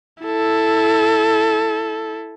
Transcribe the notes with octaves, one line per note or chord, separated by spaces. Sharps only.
E4 A4